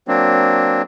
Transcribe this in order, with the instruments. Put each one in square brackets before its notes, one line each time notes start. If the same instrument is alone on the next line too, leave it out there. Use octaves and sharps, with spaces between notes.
[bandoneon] F#3 A#3 C4 D4